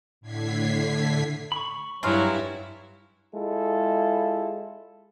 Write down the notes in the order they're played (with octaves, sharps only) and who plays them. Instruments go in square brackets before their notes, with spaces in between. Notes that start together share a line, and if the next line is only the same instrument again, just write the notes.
[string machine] A2 D3 G#6 B6 C7
[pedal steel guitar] B5 C#6
[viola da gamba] G2 E4 [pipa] C#3 F4 [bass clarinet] F#3
[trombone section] G#3 E4 F4 A4